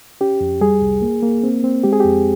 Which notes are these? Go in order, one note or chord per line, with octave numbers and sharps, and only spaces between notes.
C#4 G4
F2
G3 G#4
C2
A#3
A#3
C4
C4
G#3 G4
G#4
F2 G4